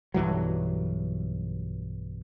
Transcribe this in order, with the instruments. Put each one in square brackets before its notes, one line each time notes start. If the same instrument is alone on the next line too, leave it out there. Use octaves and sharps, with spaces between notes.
[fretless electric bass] B1 G2 E3 F#3